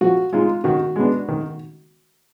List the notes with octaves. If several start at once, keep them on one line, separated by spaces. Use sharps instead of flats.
F3 F#4
G#3 D#4 F4
D#3 F#4
G#3 B3 D4
D#3